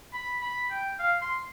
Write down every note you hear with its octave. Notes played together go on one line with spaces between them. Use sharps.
B5
B5
G5
F5
C6